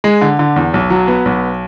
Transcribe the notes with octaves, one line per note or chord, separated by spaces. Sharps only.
G#3
D3
D3
E2
B1
F#3
B3
B1